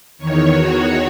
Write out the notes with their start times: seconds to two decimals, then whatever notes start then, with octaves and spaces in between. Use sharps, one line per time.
0.18 E2 D#3 C#5
0.51 F#4